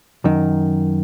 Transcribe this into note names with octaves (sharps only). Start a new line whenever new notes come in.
F#2 D#3